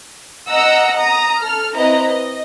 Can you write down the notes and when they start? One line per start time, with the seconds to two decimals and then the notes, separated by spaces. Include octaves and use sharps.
0.50 D#5 F#5 A#5 E6
0.99 A#5 D#6
1.41 A4 F6
1.77 C4 E4 B4 D#5 A#5
2.09 D#5